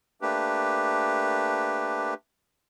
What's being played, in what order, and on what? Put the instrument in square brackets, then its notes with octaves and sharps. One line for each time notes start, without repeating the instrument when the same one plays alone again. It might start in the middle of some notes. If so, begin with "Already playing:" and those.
[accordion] A3 A#3 D4 G4 B4